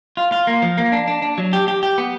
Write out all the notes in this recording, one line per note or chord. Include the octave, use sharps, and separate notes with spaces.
F4
F4
A#3
F3
A#3
D4
D4
D4
F#3
G4
G4
G4
B3